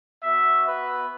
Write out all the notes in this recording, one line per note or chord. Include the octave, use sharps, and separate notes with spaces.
B3 F#4 E5
B4